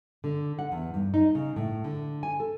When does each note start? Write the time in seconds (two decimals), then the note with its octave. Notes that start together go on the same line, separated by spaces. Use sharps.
0.24 D3
0.59 F#5
0.72 E2
0.94 G2
1.14 D#4
1.35 C#3
1.56 A2
1.84 D3
2.23 G#5
2.40 A4